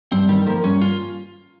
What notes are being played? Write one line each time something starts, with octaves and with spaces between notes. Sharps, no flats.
G2 C4
D#3 G3
F3 A#3
G2 C#4
F4